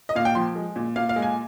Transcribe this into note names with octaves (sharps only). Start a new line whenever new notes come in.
D#5
A#2 F5
G5
F3 C6
G#3
A#2
A#2 F5
F5
G#3
G#5